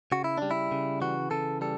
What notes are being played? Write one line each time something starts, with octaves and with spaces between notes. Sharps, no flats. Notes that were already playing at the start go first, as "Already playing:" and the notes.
C#3 F#4
E4
G3 D4
E4
C#3
E3 F#4
C#3 A4
G3 A4